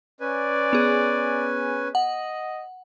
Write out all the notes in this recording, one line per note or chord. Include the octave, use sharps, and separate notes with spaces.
C#4 B4 D5 G#5
B3 G#4
D#5 F#5